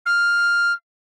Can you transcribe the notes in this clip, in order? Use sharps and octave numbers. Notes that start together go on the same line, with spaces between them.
F6